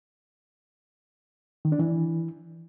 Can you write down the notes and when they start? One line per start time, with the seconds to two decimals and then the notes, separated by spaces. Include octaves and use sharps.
1.65 D#3
1.72 D4
1.79 E3